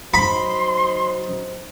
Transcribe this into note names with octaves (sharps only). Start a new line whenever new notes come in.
F#3 D#4 C5 B5 C6